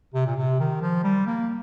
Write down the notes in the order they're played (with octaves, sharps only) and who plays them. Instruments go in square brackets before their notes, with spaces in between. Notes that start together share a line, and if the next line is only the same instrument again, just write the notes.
[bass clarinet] C3
A#2
C3
D#3
F3
G3
A#3